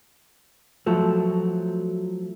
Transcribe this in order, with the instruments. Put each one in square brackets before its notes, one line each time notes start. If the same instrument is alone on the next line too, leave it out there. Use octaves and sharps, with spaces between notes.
[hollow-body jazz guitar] F3 F#3 A3